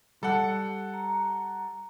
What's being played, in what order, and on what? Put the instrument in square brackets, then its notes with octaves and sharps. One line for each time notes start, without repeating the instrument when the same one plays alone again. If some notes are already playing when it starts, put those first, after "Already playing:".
[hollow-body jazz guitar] G3 [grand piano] A4 F#5
[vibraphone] A#5